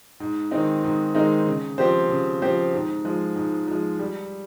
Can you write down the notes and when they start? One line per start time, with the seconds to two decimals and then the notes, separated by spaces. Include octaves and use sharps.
0.20 G#2
0.51 D#3 G#3 C4 D#4
0.84 G#2
1.15 D#3 G#3 C4 D#4
1.47 C#3
1.78 F3 C4 G4 C5
2.09 C#3
2.42 F3 C4 G4 C5
2.74 G#2
3.05 F3 G#3
3.36 G#2
3.68 F3 G#3
3.99 G3